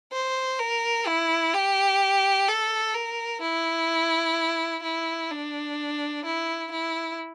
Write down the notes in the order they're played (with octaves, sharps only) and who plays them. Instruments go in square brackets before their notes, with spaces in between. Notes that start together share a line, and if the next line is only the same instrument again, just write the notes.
[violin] C5
A#4
E4
G4
A4
A#4
E4
E4
D4
E4
E4